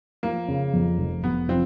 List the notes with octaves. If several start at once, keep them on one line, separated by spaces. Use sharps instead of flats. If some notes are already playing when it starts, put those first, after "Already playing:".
F3 A#3
C#3
F2
F1
F1 B3
F3 C4